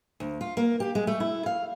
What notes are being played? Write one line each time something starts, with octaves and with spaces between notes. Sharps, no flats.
D2
F4
A#3
G4
G#3
A3
E4
F5